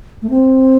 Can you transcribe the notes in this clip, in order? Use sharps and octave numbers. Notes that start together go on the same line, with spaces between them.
A3
C4